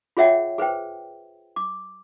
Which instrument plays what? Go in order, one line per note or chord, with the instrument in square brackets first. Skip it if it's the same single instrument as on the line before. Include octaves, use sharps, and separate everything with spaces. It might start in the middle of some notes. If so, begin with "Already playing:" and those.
[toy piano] F4 G#4 C#5 E5 F#5 G5
G#4 B4 C5 G5
D6